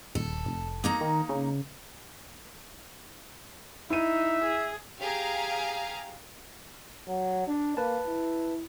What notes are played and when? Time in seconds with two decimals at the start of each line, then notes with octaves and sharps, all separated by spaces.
0.15 D#1 A4
0.46 F1
0.84 A#3 D#4 A#5
1.01 D#3
1.29 C#3
3.90 D#4 E4 E5 D#7
4.44 G#4
5.00 G4 G#4 F5 A#5
7.07 F#3
7.47 D4
7.77 A#3 B4 A5
8.07 E4